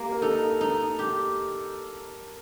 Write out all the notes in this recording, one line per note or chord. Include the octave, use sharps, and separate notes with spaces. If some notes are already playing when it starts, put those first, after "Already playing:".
Already playing: A#3 G4
A#4
D#4 A4
D#4
G4